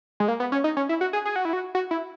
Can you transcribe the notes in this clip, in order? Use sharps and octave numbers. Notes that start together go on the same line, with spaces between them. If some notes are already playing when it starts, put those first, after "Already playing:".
G#3
A#3
B3
C#4
D#4
C#4
E4
F#4
G#4
G#4
F#4
E4
F#4
F#4
E4